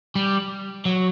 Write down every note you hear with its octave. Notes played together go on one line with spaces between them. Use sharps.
G3
F#3